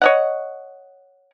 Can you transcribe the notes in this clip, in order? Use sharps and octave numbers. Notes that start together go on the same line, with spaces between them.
C#5 D#5 F#5